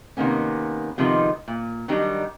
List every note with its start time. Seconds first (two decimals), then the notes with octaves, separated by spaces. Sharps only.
0.17 C3 D#3 A#3 B3 C#4
0.98 C3 D#3 F3 G#3 B3 D#4
1.48 A#2
1.88 D#3 F#3 G3 D4 D#4